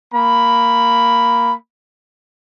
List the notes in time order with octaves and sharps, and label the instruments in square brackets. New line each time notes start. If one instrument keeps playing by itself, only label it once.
[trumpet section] A#3 B5